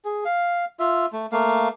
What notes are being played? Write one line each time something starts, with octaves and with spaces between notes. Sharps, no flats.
G#4
F5
F4 E5
A3
A3 A#3 F5